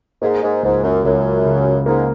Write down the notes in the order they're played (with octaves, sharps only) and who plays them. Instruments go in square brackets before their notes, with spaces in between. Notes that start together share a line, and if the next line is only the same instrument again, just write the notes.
[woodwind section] G#2 [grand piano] A#3
[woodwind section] G#2
[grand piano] C#2 [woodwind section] G#2
[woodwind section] F#2
[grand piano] C#2 [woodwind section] F#2
[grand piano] C#3
[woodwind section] G#2 [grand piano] A#3